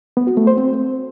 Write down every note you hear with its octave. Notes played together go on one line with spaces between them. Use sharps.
B3
F#4
A3
C5
C4